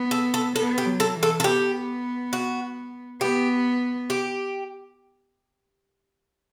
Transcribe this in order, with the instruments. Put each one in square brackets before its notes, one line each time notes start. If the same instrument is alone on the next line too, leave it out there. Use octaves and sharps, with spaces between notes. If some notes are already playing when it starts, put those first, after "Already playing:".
Already playing: [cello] B3
[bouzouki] A4
A4
[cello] B3 [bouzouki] A4
[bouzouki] G4
[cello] F#3
[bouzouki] A4
[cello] E3
[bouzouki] A4
A4
[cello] B3 [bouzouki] G4
[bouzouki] F#4
[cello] B3 [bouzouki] G4
[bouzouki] G4